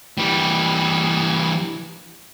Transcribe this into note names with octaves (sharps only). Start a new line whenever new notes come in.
E3 G3